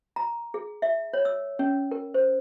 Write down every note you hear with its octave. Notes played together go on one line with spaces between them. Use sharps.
A#5
G#4
E5
C#5
E6
C#4
A#4
C5